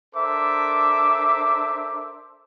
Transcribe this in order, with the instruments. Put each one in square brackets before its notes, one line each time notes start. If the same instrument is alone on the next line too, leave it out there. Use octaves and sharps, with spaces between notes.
[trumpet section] D4 A4 A#4 C5 E5 D6